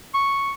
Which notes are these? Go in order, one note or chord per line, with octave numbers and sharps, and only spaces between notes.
C#6